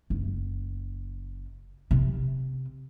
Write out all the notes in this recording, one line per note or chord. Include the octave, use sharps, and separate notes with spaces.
F#1
C3 C4